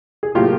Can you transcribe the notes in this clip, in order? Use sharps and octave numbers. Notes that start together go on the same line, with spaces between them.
G#4
A2 F#3 A#3 F4 G4